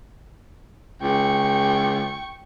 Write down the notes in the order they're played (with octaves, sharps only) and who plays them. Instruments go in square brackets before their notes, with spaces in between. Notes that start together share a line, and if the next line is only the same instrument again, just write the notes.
[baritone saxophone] C#2 [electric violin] G5 C#6